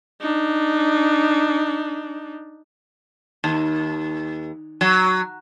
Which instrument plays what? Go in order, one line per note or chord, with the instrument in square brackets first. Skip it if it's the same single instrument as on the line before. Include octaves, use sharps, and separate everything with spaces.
[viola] D4 D#4
[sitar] D#2
F#3